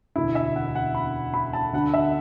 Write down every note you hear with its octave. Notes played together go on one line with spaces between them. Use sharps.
E1 D2 D3 E4
E5
F#5
F#5
B5
B5
A5
D2 D3 F#5
E5